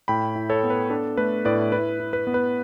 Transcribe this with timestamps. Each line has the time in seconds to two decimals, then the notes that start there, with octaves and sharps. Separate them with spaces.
0.08 A2 G5 B5
0.36 E4
0.50 A4 C#5
0.63 B3
0.70 B4
0.90 D4 A4
1.17 A3 B4
1.45 A2 B4 D5
1.72 E4 B4
2.00 E4
2.13 B4
2.27 B3
2.34 B4